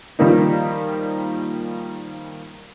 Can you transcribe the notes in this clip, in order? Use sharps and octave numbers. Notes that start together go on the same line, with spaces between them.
D#3 F3 G3 A#3 D#4